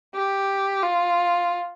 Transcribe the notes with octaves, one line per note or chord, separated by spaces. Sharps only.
G4
F4